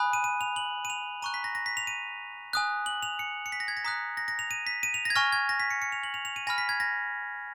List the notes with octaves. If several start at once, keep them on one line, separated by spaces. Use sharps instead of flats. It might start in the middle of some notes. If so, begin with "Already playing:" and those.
Already playing: G#5 B5 D#6 F#6
D#7
D#7
F7
F#7
D#7
F7
A#5 C#6 F#6 D#7
B6
A#6
A#6
B6
F7
D#7
G#5 D#6 F#6
F#7
F7
C#7
C#7
B6
A#6
G#6
A#6
A#5 D#6 F#6 B6
A#6
A#6
F7
D#7
B6
D#7
F7
A#6
G#6
G#5 C#6 F6 A#6
G#6
A#6
B6
C#7
C#7
F7
F#7
F7
F7
D#7
G#5 B5 F6 A#6
B6
G#6
A#6